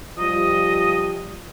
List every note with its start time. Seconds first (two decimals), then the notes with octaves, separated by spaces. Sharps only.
0.19 F3 G3 F4 D#5